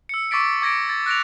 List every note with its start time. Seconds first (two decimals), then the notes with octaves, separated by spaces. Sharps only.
0.09 E6 C#7
0.31 C#6 D6 E6 A6 B6 D7
0.62 D6 G#6 A#6 C#7 D7
0.89 A6
1.06 F#6 A#6 D7 F7